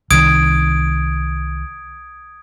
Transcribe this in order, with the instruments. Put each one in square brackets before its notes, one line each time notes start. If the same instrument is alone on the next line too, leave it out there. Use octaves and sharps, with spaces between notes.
[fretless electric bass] C2 D#3 [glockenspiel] D#6 G#6 D7